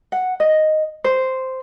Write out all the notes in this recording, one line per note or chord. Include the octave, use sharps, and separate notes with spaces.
F#5
D#5
C5